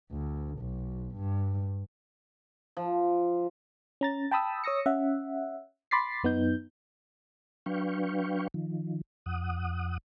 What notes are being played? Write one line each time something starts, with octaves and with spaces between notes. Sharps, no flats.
D2
B1
G2
F3
C#4 A#5 A6
G5 A5 B5 D#6 E6
C#5 D#6 E6 A#6 C#7
C#4 E5 F#5
B5 C6 D6 A6 B6 C7
F#2 B3 D#4 G6
F#3 D4 B4 F5 G5 C#6
D#3 F3
F2 F#5 D#6